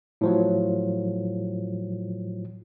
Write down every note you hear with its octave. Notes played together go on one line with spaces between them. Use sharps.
A2 F3 F#3